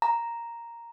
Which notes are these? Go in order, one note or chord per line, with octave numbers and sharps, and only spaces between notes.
A#5